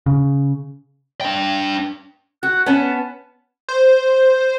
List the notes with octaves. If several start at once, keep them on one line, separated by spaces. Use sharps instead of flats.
C#3
D4 G5
F#4 F#6
B3 C#4 A5
C5